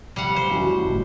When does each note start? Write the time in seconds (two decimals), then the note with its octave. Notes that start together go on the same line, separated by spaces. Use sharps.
0.16 A2 C3 F3 G3 F5 F#5
0.36 G2 F#3 C5
0.50 E2 D#3 C#4 E4 F#4
0.70 G2 D#3 A3
0.85 F#1 C2 A2